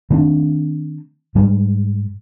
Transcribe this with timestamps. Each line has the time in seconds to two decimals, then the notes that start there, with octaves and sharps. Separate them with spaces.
0.10 D#3 A3 C4 D4
1.35 G#2 G3 G#3